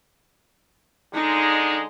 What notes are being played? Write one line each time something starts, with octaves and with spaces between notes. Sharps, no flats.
D3 G#3 D#4